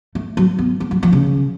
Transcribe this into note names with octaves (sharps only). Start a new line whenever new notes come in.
A3
F#3
B3
B3
F#3
F3
C#3